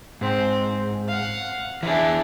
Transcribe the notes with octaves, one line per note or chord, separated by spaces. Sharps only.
G#2 C4
F5 F#5
E3 D4 E4 G#4